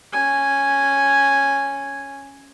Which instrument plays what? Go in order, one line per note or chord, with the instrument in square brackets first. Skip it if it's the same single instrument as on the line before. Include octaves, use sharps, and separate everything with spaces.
[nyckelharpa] C#4 G#5